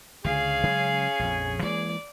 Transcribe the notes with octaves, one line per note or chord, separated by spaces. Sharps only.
C#2 D3 C#4 G#4 F5
C#3 F#3 G#3
A#1 F2
E3 G#3 A#3 D5